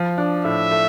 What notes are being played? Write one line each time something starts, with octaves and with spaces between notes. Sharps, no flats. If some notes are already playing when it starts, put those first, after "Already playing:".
Already playing: F3
D4
A2 E5
A3